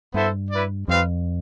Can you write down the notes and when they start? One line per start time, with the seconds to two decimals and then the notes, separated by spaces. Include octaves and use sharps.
0.14 G2 B3 E4 A4 C5 E5
0.51 E4 B4 D5
0.88 F2 G3 C4 F4 B4 F5